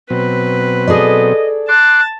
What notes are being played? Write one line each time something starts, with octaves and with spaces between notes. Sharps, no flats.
B2 F#3 C4 B4
G#4 A4 D5 D#5
A5 C6 D6 F#6